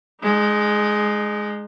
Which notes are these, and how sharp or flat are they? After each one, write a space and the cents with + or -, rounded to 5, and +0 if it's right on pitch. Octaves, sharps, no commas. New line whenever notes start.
G#3 +10 D#4 -30